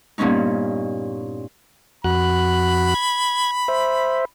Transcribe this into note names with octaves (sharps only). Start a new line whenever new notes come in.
G2 A#2 B3 C#4 D#4
F2 F#4 B5 F#6
G#6
C5 E5